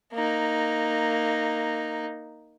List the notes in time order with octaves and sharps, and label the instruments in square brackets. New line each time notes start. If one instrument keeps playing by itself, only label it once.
[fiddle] A#3 D#4